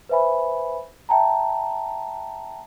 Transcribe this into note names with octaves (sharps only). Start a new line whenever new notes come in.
B4 C5 E5 G#5 B5
E5 G5 A5 A#5